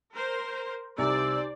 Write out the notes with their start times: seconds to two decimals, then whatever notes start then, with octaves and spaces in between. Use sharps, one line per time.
0.14 A#4 C5
0.98 C2 C3 D#4 G4 C5 D5 G#5 E6